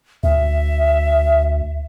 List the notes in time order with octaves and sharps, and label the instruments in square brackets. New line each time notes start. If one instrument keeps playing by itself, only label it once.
[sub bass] D2 [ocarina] E5